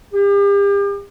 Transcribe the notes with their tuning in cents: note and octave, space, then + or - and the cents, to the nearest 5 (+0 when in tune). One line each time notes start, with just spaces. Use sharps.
G4 +40